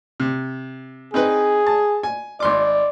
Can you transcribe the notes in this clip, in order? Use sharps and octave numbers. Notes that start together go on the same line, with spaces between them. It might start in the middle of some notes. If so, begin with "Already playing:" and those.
C3
C4 D#4 G#4 B4
A5
G#5
G#1 D5 C6 D6